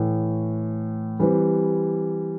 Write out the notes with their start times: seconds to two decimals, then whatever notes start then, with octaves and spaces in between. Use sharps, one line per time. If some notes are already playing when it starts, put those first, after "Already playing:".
Already playing: A2 E3 A3
1.20 E3 G3 C4 G4 B4